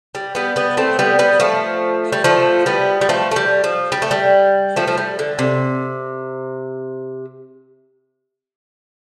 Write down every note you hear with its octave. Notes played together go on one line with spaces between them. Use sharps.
G3
G3 B3
G3 B3
A3 C4
G3 B3
G3 B3
F3 A3
G3
F3 A3
G3 B3
G3
F3 A3
A3
G3
F3
G3
A3
G3
F3 A3
F3
G3
D3
C3